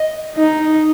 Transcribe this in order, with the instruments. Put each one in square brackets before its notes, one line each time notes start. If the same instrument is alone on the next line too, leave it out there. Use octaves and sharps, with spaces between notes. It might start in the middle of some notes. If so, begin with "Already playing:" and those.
Already playing: [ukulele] D#5
[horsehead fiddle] D#4